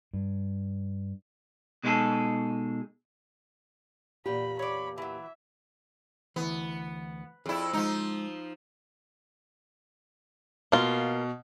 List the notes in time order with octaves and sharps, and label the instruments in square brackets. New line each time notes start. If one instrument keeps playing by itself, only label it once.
[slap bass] G2
[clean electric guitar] B2 G#3 D#4 E4 G#4 A4
[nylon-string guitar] E2 A#2 G4 [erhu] B5
[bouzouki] C#5 D5 [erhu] B5
[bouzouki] E3 F#3 [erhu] E5
[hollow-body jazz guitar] D2 E3 [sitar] B3
[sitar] F2 E4 [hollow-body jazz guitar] G#4 D5
[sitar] F3 D#4 [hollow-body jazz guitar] G#3 A#5
[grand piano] B2 [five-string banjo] A#3 F4